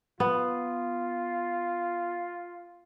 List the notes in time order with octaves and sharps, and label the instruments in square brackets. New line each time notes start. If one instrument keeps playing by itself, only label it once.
[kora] B3 [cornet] F4